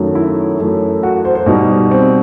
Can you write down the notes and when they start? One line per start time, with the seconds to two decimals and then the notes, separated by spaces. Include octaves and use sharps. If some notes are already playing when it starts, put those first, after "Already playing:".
Already playing: F#2 D#3 F#3 A3
0.15 E4
0.59 F#2 E3 A3
1.03 F#4
1.25 C5
1.35 C5
1.46 B2 G3 D#4
1.91 C4